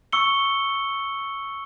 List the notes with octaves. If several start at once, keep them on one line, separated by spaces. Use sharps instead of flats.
C#6 E6 C#7 G7